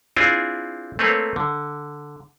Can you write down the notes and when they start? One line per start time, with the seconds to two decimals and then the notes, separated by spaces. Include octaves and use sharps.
0.17 C4 D4 E4 F4 G#4
0.99 A3 A#3 C4 B4 C#5
1.36 D3